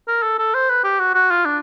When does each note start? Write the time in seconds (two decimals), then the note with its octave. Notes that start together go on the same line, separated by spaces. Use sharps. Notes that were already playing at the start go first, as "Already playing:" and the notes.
0.08 A#4
0.23 A4
0.39 A4
0.54 C5
0.69 B4
0.84 G4
1.00 F#4
1.14 F#4
1.31 F4
1.45 D4